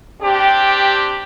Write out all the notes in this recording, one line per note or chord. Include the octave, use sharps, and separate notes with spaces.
C4 D4 G4